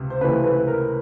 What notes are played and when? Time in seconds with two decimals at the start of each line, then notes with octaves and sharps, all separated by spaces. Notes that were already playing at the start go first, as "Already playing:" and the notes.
Already playing: C#2 C3
0.10 C5
0.21 C#2 C3 E3 A3 B4
0.44 B4
0.68 A#4